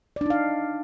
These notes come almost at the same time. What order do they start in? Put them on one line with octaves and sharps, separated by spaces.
D5 D4 D#4 F5